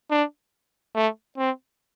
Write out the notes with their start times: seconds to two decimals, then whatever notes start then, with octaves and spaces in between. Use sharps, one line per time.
0.11 D4
0.95 A3
1.38 C4